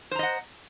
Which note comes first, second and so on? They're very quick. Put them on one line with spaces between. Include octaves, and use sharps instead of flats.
C5 A#5 D#5 F#5